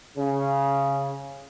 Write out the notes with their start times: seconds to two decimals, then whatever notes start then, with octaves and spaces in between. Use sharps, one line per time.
0.17 C#3